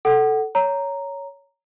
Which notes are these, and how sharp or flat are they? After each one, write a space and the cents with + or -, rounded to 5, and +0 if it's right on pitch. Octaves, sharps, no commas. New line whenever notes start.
A4 +0 F#5 +25
C#5 +10 A#5 -5